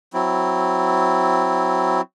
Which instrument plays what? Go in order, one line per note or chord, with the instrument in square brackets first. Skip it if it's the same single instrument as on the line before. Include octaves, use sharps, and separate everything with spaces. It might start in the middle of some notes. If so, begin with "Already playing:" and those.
[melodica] F#3 C4 E4